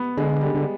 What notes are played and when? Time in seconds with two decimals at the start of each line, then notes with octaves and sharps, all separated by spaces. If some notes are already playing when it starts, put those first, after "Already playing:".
Already playing: B3
0.17 D3 G#3
0.41 G3
0.55 D3